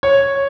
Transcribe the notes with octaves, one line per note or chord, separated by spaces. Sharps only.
C#5